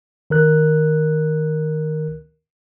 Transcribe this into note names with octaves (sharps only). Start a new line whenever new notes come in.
D#3 A#4 F#6